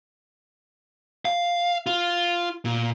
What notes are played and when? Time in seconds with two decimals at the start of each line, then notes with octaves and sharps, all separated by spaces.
1.25 F5
1.86 F4
2.65 A#2